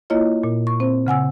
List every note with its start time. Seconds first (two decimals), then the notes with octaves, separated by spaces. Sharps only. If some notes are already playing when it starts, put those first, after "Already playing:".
0.10 A#3 E4 F4 C#5 D#5
0.44 A#2
0.67 C#6
0.80 C4 C5
1.07 C#3 F#5 G#5 E6